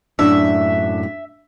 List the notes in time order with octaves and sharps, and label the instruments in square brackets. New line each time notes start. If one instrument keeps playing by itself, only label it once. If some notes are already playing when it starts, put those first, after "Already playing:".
[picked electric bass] F#2 A2 [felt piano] D4 [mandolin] E5